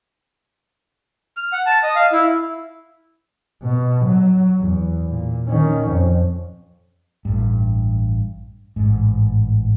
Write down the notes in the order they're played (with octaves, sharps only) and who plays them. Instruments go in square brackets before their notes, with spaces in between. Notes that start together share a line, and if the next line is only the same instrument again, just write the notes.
[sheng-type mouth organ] F6
F#5
A5
D#5
F5
E4
[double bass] B2
F#3
E2
A#2
D#3 C#4
F2
[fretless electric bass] A1 G2
A1 G#2